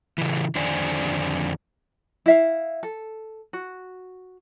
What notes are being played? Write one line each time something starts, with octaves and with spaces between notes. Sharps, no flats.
C#3 E3
F2 D3 D#3 C5 D5 G#5
E4 E5 F5
A4
F#4